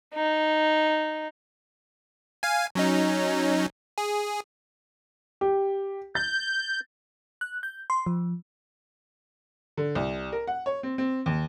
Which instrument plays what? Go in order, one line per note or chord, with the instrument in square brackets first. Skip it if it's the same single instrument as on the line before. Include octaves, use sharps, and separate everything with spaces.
[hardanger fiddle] D#4
[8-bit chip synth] F5 G#5
F#3 C#4 D#4
G#4
[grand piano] G4
[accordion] G6 [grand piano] A6
[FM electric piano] F#6
G6
C6
F3
[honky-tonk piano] D3
C2
A#4
F#5
C#5
C4
C4
D#2